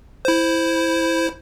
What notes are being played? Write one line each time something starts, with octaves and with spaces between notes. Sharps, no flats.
E4 C5